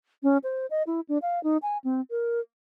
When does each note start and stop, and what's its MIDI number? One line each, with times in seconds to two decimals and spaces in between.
0.23 0.38 61
0.44 0.66 72
0.70 0.83 75
0.87 1.00 64
1.09 1.18 62
1.22 1.42 77
1.44 1.57 63
1.62 1.78 80
1.84 2.01 60
2.11 2.40 70